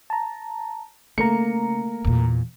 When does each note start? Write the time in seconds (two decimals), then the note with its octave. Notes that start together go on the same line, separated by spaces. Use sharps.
0.10 A5 A#5
1.18 C#3 A3 A#3 A#5 C#7
2.05 E2 A#2